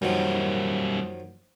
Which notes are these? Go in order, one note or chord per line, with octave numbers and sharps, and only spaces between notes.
F#2 D#3 F3 G3 A#3